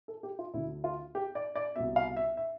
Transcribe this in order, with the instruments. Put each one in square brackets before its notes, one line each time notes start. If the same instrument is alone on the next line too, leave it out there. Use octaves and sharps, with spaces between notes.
[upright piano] A4
G4
F4
D2 D3 E4
F4
G4
D5
D5
C2 B2 E5
F5
E5
E5